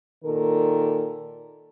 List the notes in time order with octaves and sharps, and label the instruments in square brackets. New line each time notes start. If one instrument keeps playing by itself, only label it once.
[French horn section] A#2 D#3 A4 A#4